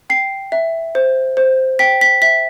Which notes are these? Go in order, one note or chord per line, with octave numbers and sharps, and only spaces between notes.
G5 C7
E5
C5
C5
G5 B6
B6
E5 B6